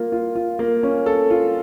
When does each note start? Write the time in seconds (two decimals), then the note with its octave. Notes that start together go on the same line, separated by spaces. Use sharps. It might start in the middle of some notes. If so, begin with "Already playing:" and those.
Already playing: A#3 F4
0.12 F4
0.35 F4
0.59 A#3
0.83 C#4
1.06 A4
1.30 F4